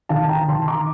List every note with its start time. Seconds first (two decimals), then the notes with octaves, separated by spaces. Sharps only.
0.09 D#3 F5 A5
0.29 G5 A#5
0.48 D#3 A5 C6
0.67 A#5 D6